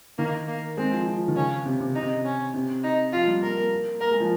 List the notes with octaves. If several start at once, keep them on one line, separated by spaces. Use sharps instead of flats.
D#3 A#3
A#3
G#3 C4
F3
F3
D#3
C#3 C#4
C3
C3
D#4
C3
C#4
C3
D#4
F3 F4
G3
A#3 A#4
A#3
A#3 A#4
G#3
F3